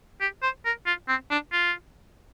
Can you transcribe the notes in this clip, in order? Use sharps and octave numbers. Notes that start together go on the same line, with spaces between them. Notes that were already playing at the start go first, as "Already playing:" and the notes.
G4
C5
A#4
F4
C4
D4
F4